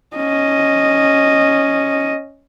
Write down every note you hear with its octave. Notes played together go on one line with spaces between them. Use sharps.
C#4 D#5